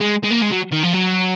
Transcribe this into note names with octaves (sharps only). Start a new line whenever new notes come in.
G#3
G#3
A#3
G#3
F#3
D#3
F3
F#3